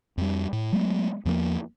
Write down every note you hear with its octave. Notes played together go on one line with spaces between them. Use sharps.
F2 G3
A2
F#3 G#3 A3 B3
E2 F3 G3 A#3